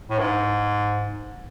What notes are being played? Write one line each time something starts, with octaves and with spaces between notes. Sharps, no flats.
A2
G#2